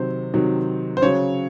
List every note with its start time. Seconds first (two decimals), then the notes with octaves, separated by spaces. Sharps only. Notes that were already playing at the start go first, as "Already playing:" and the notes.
Already playing: C3 D#3 F#3 C5
0.34 C3 D#3 F#3
0.97 C5
1.02 C#3 F#3 C#5